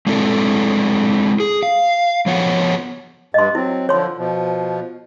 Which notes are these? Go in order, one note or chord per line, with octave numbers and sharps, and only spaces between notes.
G#3 C4 D4 E4 G#4 A4
G#4
F5
F3 B3 C#5 F#5
G2 D#5 C6
F#3 C4 E4
D3 F3 C#5 C6
B2 F3